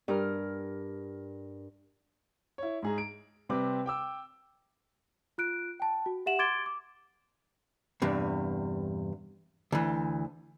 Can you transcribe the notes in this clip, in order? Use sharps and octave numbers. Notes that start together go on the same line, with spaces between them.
G2 A#4 F6
E4 C#5
G#2 G#4 A#5
D7
C3 G3 C4 B4 D6
G5 D6 E6
F4 F#6 D7
G5 A5
F#4
G4 E5 F#5 E7 F#7
C6 D6 G#6 A6 D7 G7
D6
E2 G2 C3
D2 E3